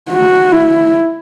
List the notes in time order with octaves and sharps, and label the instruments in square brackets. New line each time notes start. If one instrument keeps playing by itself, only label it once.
[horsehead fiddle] F#4
E4